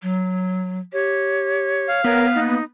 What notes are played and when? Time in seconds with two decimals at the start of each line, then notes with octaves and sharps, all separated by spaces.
0.02 F#3
0.93 G4 C#5
1.88 F5
2.04 B3 A#4 C#5
2.35 A#3 D#4